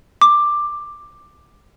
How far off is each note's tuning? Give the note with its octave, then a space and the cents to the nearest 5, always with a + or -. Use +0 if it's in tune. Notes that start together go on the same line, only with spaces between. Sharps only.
D6 +10